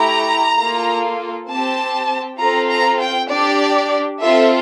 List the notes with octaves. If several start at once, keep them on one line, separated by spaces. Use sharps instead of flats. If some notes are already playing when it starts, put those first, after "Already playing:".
Already playing: A3 E4 G4 A#5
A#3 F4 A4
C4 G4 A5
C4 F4 A4 A#5
A#5
G5
D4 G4 D5
C4 F4 A4 E5